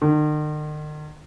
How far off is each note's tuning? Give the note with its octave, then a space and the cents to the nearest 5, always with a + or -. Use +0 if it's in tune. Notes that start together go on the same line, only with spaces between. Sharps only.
D#3 -45